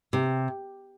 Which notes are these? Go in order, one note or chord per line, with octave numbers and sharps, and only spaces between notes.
C3